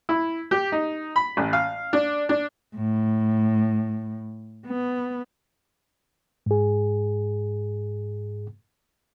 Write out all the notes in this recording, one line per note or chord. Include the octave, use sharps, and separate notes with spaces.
E4
G4
D#4
B5
A1
F5
D4
D4
A2
B3
G#2 G#4